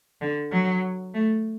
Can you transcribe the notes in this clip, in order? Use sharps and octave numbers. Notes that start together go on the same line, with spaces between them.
D3
F#3
A3